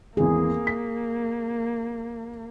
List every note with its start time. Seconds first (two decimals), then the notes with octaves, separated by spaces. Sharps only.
0.17 G#1 E2 A#3 G#4
0.67 B6